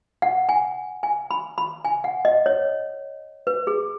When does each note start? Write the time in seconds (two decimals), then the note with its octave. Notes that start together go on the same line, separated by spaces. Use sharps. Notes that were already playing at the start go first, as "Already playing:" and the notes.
0.22 F#5
0.49 G#5
1.03 G#5
1.31 B5
1.58 B5
1.85 G#5
2.04 F#5
2.25 D#5
2.46 C#5
3.47 B4
3.67 G#4